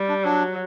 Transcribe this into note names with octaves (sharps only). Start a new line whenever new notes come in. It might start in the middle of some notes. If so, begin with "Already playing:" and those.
Already playing: G3
D4
F#3 D4